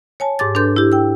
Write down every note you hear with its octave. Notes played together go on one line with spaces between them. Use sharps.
C#5 G#5 A5
G#2 G4 D6 A6
D4 A4 B4 C6 G6
E4 G4
G5 E6